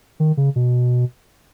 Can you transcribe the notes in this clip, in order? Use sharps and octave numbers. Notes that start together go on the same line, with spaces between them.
D#3
C#3
B2